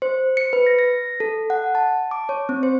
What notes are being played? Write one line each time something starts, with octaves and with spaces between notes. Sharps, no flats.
C5
C#7
B4
A#6
A#6
A4
F#5
A5
D6
C#5
C4
C5